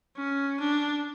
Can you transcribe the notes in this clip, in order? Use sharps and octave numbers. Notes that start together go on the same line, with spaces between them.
C#4
D4